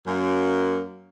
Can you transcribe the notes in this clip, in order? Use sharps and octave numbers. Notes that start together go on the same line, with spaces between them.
F#2 A#3